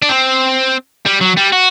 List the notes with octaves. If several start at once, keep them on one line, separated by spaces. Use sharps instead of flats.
D4
C4
G3
F#3
G3
F#4